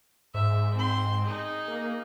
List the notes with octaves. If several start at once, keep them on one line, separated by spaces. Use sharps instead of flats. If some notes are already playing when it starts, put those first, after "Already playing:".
G#2 E5
C4 C6
D#4 G#4
A#3